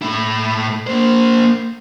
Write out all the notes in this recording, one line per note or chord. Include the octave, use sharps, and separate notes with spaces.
A2 E4
A#3 C5